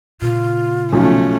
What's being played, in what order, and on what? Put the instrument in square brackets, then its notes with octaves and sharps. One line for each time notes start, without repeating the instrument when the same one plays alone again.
[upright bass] A#2 C#3 [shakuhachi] F4
[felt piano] B1 F3 F#3 [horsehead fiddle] A3 C#4